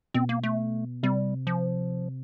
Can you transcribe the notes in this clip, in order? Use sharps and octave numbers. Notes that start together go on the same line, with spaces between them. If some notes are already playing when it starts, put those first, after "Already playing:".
B2 C4
A#3
A3
C3 G3
F3